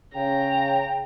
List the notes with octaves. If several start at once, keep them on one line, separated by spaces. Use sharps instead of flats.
C#3 G5 A#5